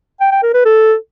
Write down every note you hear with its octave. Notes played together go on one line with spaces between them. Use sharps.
G5
G5
A#4
B4
A4